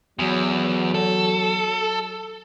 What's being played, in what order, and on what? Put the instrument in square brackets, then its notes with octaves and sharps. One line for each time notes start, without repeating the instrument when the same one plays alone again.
[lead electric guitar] E2 [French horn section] F#3
[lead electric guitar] A4